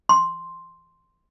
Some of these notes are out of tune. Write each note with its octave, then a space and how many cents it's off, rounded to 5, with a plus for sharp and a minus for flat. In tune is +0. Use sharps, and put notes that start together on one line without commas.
C6 +0